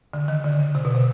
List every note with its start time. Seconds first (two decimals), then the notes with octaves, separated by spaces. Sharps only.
0.14 D3
0.28 D#3
0.44 D3
0.59 C#3
0.75 C3
0.85 B2
0.95 C3